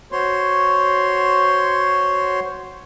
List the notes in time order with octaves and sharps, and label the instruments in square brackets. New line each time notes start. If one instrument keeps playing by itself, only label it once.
[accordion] F#4 C5 C#5 C6